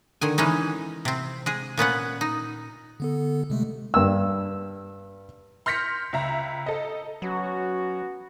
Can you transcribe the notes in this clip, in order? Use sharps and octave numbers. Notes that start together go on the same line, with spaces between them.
D3 D#3 G#5
E3 G#3 C#4 D#4
C3 C4
G#3 G#4
A#2 B3 C#4 F#5
D#4
D3 B3 A4
C3 G#3 A3
G2 E6
C6 F6 G6 A#6 B6 C#7
C#2 E5 A#5
A4 D#5
F#3 B3 C#4 F#4